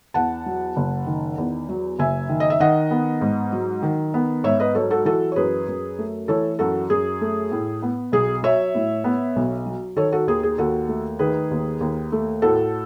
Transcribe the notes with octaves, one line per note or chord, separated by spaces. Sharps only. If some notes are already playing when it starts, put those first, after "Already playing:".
E2 F#5 A5
F#3
F#1
D#3
E2
F#3
F#1 E5 G#5
D#3
D#5
E5
D#3 D#5 F#5
B3
G#2
F#3
D#3
B3
G#2 C#5 E5
B4 D#5
F#3 A4 C#5
F#4 A4
E3 F#4 A4
C#5
F#2 G#4 B4
F#2
A3
E3 A4 C#5
F#2 F#4 A4
F#2 G#4
A3
A2
B3
B1 G#4
F#3 C#5 E5
A2
B3
B1
F#3
D#3 A4 C#5
F#4 A4
D#2 G#4
G#4
D#2 F#4 A4
A3
D#3 G#4 B4
D#2
D#2
A3
A2 F#4 A4